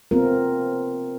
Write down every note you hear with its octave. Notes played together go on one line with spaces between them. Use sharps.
B3 C4 F4 A#4